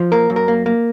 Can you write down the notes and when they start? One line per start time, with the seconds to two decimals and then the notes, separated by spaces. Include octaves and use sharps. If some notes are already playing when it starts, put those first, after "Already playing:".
Already playing: F3
0.12 A#3 A#4
0.30 F#2
0.36 A#4
0.48 A#3
0.66 A#3